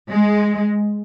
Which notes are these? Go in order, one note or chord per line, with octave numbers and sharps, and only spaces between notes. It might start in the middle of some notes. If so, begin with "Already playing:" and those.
G#3